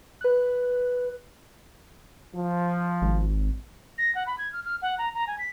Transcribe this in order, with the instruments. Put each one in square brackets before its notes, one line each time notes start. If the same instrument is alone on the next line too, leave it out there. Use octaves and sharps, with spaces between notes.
[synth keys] B4 F#6
[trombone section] F3
[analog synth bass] G#1
[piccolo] A#6
F#5
B5
G#6
F6
F6
F#5
A#5
A#5
G#5
B6